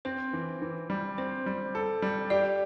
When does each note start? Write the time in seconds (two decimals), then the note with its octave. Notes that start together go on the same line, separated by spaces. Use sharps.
0.05 C4 C5
0.33 E3
0.62 E3
0.90 G3
1.18 C4 C5
1.46 G3
1.75 A4
2.02 G3
2.30 G4 D5